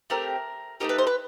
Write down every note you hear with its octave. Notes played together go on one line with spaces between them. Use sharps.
A3 C4 G4 A#4
A3 C4 D#4 G4 A#4
B4
C5
B4